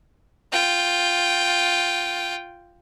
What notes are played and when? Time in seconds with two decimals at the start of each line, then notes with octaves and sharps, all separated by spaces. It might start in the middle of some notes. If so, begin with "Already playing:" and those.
0.52 F4 G5